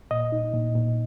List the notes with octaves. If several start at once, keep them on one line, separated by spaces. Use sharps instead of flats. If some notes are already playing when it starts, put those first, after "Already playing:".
A#2 D#5
D#4
A#2
A#2